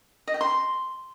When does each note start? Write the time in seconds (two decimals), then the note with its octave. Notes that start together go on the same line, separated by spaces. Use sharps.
0.28 D#5
0.34 G5
0.41 C6